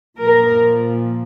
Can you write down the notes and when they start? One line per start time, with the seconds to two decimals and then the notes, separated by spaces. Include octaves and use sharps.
0.18 A#2 F3 A#4